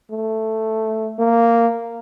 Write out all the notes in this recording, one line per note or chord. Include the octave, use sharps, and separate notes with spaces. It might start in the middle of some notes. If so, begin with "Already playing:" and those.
A3
A#3